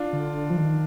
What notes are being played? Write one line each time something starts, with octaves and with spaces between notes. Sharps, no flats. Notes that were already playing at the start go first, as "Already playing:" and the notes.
Already playing: D4 F4
D3
F3
D#3